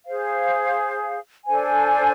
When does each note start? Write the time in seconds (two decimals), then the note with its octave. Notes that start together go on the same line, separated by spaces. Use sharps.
0.06 G#4 C5 F5
1.46 D4 A4 C5 G#5